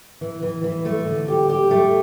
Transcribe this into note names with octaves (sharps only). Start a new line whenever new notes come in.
E3
E3
E3
A3
D3
G4
G4
A3